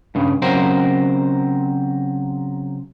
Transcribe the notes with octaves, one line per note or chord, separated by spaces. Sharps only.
G2 C#3
C#3 F#3 C4 A#4 C5